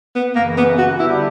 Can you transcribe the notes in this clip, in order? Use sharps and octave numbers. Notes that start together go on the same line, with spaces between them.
B3
F#2 C#3 E3 A#3
B3
F#4
D3 G3 B3 D4 E4 G4